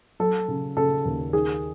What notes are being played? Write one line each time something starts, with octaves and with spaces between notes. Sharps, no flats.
F#3 A4
C#3
C#3 A4
D#2
D#3 G#4